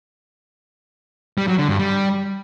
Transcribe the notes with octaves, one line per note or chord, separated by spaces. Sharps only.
G3
F#3
D3
G2
G3